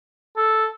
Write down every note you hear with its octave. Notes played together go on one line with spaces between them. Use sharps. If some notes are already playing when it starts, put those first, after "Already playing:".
A4